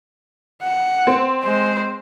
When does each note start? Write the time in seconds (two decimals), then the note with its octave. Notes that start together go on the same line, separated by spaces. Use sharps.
0.62 F#5
1.07 C4
1.43 G#3 C5